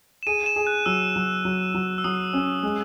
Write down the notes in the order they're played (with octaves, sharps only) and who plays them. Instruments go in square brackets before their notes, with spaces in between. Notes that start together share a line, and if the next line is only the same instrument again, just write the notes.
[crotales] E7
[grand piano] G#4 [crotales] D#7
[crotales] E7
[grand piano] G#4
[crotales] F#6
[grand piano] F#3 [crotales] E6
[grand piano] F#3
F#3
F#3
[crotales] E6
[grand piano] F#3 [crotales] D#6
[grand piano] C#4
G#3